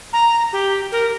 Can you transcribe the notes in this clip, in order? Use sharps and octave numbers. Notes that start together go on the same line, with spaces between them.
A#5
G4
A#4